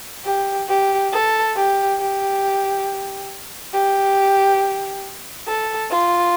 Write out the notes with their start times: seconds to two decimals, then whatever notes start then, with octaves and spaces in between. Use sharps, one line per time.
0.25 G4
0.68 G4
1.12 A4
1.56 G4
1.99 G4
3.73 G4
5.47 A4
5.90 F4